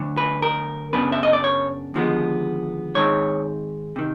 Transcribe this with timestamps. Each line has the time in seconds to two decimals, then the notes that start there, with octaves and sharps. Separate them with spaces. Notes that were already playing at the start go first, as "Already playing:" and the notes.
Already playing: D2 D3 F#3
0.17 B4
0.42 A#4
0.93 F#2 C#3 F#3 B3 D4 B4
1.12 E5
1.23 D#5
1.33 D5
1.44 C#5
1.94 D#2 D3 F3 G#3 B3
2.95 G#2 D#3 G#3 C4 C#5
3.96 C3 D#3